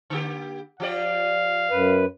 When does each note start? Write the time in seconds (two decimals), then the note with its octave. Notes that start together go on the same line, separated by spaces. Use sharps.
0.10 D3 A#3 G4
0.80 F3 G4 D5 F5
1.71 F#2 B4